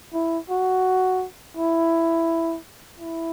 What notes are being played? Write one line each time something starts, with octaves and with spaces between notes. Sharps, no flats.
E4
F#4
E4
E4